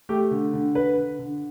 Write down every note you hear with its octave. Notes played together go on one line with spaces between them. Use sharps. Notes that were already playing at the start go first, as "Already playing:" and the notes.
A3 G4
D3
D3
D3 B4
D3
D3